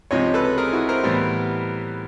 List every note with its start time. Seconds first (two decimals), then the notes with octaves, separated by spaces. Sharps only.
0.11 C#2 C3 F3 C#5 D#5
0.34 A4 B4
0.58 G#4 A#4
0.72 E4 F#4
0.89 A#4 C5
1.03 A2 E3 G3 B3